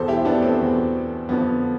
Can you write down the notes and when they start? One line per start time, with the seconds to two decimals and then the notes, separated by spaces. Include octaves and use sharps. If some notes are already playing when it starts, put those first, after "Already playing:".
Already playing: E2 B2 A4 C5
0.08 E4 G4
0.25 B3 D4
0.42 A3 C4
0.59 E2 B2
1.29 F2 D3 F3 B3